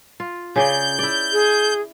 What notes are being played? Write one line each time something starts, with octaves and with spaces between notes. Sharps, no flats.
F4
C#3 G#4 D5 G6
E4 D5
G#4